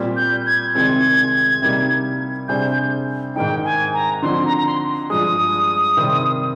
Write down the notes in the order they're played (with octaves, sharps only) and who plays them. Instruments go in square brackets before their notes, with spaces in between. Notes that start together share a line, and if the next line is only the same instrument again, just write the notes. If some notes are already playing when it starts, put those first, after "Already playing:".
Already playing: [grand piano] A#2 G3 C4 G4
[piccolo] G6
G#6
[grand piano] C2 C3 D#3 G#3 C4 [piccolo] G#6
[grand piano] C3 G3 A#3 D#4 G4
[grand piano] C3 G3 D4 G#4 C5 [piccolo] G6
[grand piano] G#2 D#3 G#3 D#4 [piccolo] G5
[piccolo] G#5
A#5
[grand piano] D3 F3 C4 D#4 [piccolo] C6
[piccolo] A#5
A#5
C6
[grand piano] G2 F3 G#3 [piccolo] D#6
[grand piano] C3 D#3 G3 C4